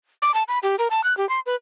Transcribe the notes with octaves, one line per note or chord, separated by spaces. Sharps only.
D6
A5
B5
G4
A#4
A5
F#6
G4
C6
B4